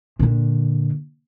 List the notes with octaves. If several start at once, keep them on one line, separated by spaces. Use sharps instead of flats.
A#2 D3